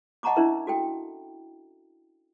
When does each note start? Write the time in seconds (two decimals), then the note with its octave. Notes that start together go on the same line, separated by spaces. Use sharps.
0.23 D#5 F#5 A5 A#5 C#6 D6
0.36 C#4 D4 E4 A#4 E5
0.67 F#4 A4 G5